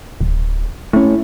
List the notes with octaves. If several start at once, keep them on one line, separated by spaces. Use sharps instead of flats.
D1
A3 C#4 E4